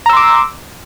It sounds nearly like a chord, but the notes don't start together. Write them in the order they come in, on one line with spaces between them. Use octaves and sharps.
A#5 E6 C6 D6